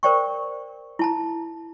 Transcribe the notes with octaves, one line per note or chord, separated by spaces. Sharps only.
A#4 C5 D5 G5 C#6
E4 A5 A#5